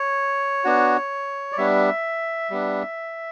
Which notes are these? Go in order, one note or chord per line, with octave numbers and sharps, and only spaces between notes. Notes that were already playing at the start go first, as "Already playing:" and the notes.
Already playing: C#5
B3 D4 F#4
D5
G3 B3 D4 E5
G3 B3 D4